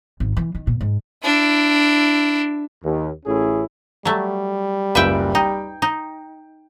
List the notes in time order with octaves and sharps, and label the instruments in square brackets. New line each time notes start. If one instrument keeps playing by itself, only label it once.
[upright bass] G#1
E3
D#3
A#2
G#2
[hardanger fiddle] D4 E4
[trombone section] D#2
A1 A2 C#4 E4 G#4
[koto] F#3 A3 [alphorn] G3
[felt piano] F#1 C#2 [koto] B4 E5 G5
[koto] D#4 [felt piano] G5
[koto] D#4